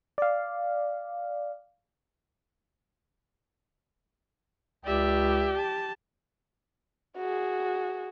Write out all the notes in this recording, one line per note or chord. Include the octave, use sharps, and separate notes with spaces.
D5 F5
C#2 G4 D5 E5
A5
F#4 G#4